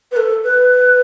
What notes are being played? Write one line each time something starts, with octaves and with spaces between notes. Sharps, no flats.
B4
A4
B4